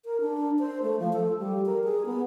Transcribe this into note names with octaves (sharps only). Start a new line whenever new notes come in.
A#4
D4
C5
A3
F3
A4
G3
A#4
G#4
B3